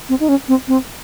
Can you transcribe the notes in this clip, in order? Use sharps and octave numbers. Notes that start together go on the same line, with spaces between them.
C4
D#4
C#4
C4
C4